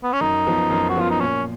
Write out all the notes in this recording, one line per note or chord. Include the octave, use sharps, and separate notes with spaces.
B3
C#4
F#2 D#4
F3 B3
F#2
F#4
F3 B3 F4
D#4
A#2 C#4